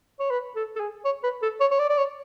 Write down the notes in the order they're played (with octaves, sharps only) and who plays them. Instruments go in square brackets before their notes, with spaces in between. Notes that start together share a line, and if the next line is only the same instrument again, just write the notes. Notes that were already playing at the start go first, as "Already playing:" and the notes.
[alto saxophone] C#5
B4
A4
A4
G#4
C#5
B4
A4
C#5
C#5
D5
D5
C#5